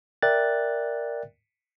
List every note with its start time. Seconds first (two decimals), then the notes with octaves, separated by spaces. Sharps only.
0.22 A#4 D5 E5 G5 F#6 A6